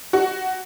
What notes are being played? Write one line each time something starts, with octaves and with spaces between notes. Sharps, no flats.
F#4